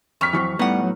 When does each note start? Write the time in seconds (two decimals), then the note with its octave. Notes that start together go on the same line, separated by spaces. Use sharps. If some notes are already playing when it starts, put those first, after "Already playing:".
0.21 F2 C#6 F6 B6
0.33 E3 F#3 C4
0.59 A2 G3 B3 D#4 F#5
0.82 F#3